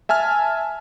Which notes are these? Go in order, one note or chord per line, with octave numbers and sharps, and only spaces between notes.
E5 G#5 A5 F6